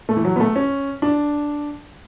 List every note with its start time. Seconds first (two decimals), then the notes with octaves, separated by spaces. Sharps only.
0.09 A3
0.17 E3
0.25 F#3
0.36 B3
0.40 A3
0.56 C#4
1.02 D4